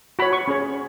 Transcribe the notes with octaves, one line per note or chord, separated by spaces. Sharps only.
F#4 C#5 B5
C#6
C#4 G#4 C#5